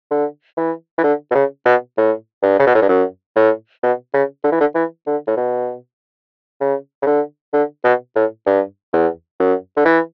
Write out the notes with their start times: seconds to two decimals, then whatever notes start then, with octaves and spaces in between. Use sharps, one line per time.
0.11 D3
0.58 E3
0.99 E3
1.04 D3
1.31 B2
1.35 C#3
1.66 B2
1.98 A2
2.43 G2
2.59 C#3
2.67 B2
2.75 A2
2.82 G2
2.89 F#2
3.36 A2
3.83 B2
4.14 C#3
4.44 D3
4.52 E3
4.61 D3
4.75 E3
5.07 D3
5.27 A2
5.37 B2
6.61 C#3
7.02 C#3
7.07 D3
7.54 D3
7.84 B2
8.16 A2
8.46 G2
8.93 E2
9.40 F#2
9.77 D3
9.85 E3